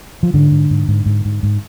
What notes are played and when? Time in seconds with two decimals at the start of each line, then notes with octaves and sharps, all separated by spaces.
0.23 F3
0.34 G#2 D3
0.51 G#2
0.70 G#2
0.88 G#2
1.06 G#2
1.25 G#2
1.43 G#2